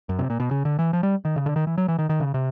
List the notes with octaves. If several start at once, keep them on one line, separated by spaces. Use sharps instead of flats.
F#2
C3
A#2
B2
C#3
D3
E3
F3
G3
D#3
C#3
D3
D#3
E3
F#3
E3
D#3
D#3
C#3
C3